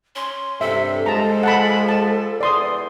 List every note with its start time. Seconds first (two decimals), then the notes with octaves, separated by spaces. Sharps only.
0.16 C#4 C6
0.61 G2 C3 A4 E5
1.06 F3 G#3 A5 A#5
1.43 F#5 A5 B5
1.89 A5
2.41 E2 D5 C6 D#6